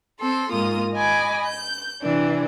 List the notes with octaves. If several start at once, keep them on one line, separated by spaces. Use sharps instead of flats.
C4 A4 C6
G#2 A#3 F4 D#6
D#5 G#5 B5 D6
G6
C3 E3 D4